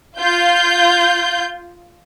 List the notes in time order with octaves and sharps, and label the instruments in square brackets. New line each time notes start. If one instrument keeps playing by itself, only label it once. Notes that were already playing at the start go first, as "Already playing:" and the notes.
[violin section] F4 G6